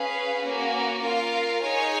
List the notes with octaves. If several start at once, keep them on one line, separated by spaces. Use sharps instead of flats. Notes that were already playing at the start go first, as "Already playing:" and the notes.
Already playing: C#4 G#4 B4 F5
A#3 C#4 F#4
F4 A#4 F5
D#4 G#4 C#5 G#5